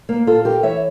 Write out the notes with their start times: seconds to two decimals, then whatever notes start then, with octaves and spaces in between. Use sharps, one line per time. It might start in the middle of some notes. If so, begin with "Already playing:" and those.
0.09 A#3
0.26 A#2 F4 A4
0.45 G4 A#4
0.63 E3 C#5 E5